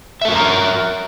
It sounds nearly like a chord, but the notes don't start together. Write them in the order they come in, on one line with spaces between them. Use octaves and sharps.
E5 A4 F#4 A#4 A#5